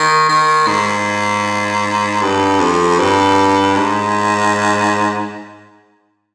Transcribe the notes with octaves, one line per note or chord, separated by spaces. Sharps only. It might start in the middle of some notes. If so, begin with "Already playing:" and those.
Already playing: D#3
D#3
G#2
G2
F2
G2
G#2